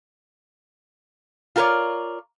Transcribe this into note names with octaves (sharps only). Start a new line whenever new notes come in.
F4 F#4 A#4 B4 C#5 D5